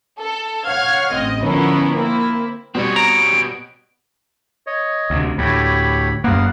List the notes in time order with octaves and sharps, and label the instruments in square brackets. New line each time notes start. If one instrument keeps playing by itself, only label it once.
[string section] A4
C#5 F5 F#5 F6 G#6
A1 C4 D#5
D3 F3 B3 C#4 E4 A#4
A#3 C4 E4
[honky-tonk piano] B2 G3 [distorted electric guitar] C4 C#5
[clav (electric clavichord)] A#5 [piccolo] D7
[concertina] C#5 D#5
[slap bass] D2 C3
[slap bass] D2 A2 [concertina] G4 C#5 B5
[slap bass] F#2 A#3 [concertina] B3 F5 F#5